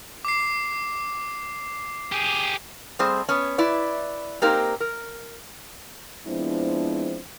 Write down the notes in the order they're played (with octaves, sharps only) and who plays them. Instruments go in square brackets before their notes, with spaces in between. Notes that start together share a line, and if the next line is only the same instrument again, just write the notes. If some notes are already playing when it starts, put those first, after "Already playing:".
[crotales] D6 C7
[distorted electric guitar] G4 G#4
[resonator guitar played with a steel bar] G3 A3 C4 G#4 C5
B3 C#4
E4 B4 D5
A#3 C4 D#4 G4 A#4
A#4
[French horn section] F3 G#3 B3 C4 D4 E4